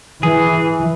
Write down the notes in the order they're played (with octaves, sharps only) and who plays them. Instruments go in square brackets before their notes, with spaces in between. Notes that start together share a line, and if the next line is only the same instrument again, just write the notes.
[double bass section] E3 [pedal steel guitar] G#4